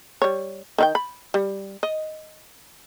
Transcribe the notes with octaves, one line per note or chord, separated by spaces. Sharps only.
G3 C#5
D#3 E4 G5
B5
G3
D#5